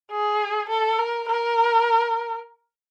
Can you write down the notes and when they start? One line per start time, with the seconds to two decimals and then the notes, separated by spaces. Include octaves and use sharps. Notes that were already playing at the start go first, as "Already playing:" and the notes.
0.11 G#4
0.69 A4
0.99 A#4
1.29 A#4